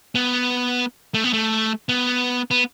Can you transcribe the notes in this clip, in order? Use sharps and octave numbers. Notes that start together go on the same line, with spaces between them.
B3
A3
B3
A3
B3
B3